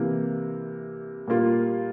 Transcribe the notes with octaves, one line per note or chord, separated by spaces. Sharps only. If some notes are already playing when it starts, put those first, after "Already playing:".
Already playing: C3 E3 A#3
A#2 G3 A#3 F4